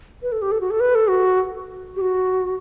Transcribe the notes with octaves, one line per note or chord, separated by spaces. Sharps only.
B4
A4
G4
A4
F#4
A4
B4
A4
F#4
G4
F#4